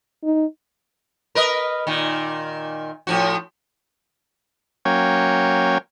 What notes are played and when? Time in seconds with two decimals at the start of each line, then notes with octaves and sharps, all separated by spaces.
0.23 D#4
1.35 A#4 B4 D#5
1.87 A#2 D#3
3.07 A2 F3 F#4
4.85 F#3 A#3 C#4 C#5 G5